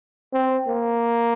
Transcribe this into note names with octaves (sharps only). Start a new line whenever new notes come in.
C4
A#3